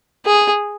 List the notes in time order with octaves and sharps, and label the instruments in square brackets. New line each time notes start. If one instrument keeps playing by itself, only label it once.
[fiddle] G#4